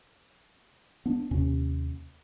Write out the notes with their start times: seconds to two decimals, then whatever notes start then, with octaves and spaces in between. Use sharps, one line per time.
1.06 B3 D4
1.31 D#2 C3 C#4